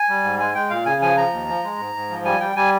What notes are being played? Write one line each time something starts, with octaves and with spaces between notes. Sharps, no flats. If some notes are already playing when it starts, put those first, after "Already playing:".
Already playing: G#5
G3
G#2
G#3 G#5
G#3 G5
A#2 F5
C#3 G#5
F3 G#5
F3 A#5
D#2
F3
G#3
G#2
G#2
F3
G3 G#5
G3 G5
G3 G#5